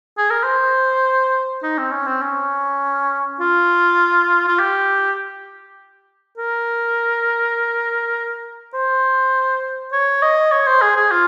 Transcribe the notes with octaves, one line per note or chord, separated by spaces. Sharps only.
G#4
A#4
C5
D#4
C4
C#4
C4
C#4
F4
F4
G4
A#4
C5
C#5
D#5
C#5
C5
G#4
G#4
F4